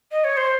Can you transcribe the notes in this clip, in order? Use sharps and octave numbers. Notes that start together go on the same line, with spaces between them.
D#5
C#5
C5